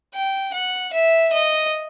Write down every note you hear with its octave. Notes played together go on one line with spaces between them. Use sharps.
G5
F#5
E5
D#5